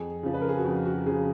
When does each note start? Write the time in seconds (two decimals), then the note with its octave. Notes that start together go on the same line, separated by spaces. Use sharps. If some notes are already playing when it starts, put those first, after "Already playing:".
Already playing: F2 G#4
0.23 C#3 F3
0.34 B4
0.41 A#4
0.49 G#4
0.57 F#4
0.64 F2 F4
0.85 F#4
0.96 F#4
1.06 C#3 F3 G#4